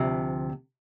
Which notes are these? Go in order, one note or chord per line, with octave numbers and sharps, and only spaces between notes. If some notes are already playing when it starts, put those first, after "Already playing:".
Already playing: D2 C3 F3